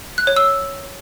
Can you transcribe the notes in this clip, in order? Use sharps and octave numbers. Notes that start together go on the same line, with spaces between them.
F#6
C#5
E6